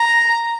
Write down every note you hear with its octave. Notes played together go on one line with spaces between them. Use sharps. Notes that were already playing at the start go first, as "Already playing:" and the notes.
Already playing: A#5